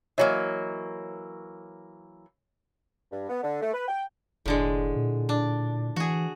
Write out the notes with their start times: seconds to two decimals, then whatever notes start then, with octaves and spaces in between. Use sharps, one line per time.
0.18 E3 F#3 A#3 C#5 D#5 E5
3.12 G2
3.30 B3
3.44 D3
3.62 A3
3.74 B4
3.88 G5
4.46 F1 A2 D3 G#3
4.96 A#2
5.29 D4
5.96 E3 F#4 G#4